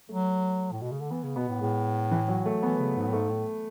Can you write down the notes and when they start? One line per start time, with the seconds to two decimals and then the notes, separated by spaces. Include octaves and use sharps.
0.09 F#3 A3
0.72 A2
0.81 B2
0.91 C#3
1.00 D3
1.11 E3 B3
1.23 C#3
1.36 B2 B3
1.49 A2
1.61 A2 G#3
2.11 E3
2.28 F#3
2.46 A3
2.62 E3 B3
2.79 C#3
2.96 G#2
3.07 A2
3.13 G#2 A3
3.29 A2